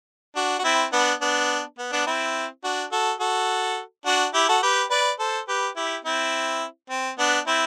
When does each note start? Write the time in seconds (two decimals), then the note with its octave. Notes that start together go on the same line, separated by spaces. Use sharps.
0.36 D4 F#4
0.59 F#4
0.64 C4 E4
0.93 B3 D4
1.21 B3 D4
1.78 B3
1.92 B3 D4
2.06 C4 E4
2.64 D4 F#4
2.92 F#4 A4
3.20 F#4 A4
4.06 D4 F#4
4.34 E4 G4
4.48 F#4 A4
4.63 G4 B4
4.91 B4 D5
5.19 A4 C5
5.48 G4 B4
5.76 E4 G4
6.05 C4 E4
6.90 C4
7.18 B3 D4
7.47 C4 E4